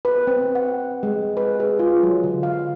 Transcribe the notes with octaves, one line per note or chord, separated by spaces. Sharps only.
B4
C4
F#5
G#3
B4
G#4
F4
F#3
D3
F5